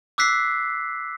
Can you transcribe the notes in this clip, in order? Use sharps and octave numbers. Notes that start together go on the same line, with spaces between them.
D6 E6 F#6 B6 C7